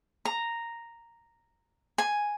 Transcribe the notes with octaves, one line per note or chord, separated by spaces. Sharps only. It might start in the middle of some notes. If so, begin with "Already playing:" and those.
A#5
G#5